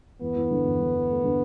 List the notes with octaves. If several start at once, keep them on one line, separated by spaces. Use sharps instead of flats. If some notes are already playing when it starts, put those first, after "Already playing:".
E2 B3
E2
D3
E2
D3
E2
A3
D3